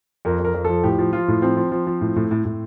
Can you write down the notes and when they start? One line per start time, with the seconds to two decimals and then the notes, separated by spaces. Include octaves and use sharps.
0.25 F2 A#4
0.40 F2 A#4
0.55 F2
0.65 F3 A4
0.84 A2 G4
0.98 F3
1.13 F3 F4
1.28 A2
1.42 F3 C4
1.57 F3
1.72 F3
1.87 F3
2.01 A2
2.16 A2
2.31 A2
2.45 A2